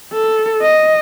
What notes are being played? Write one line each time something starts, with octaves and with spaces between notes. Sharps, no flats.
A4
D#5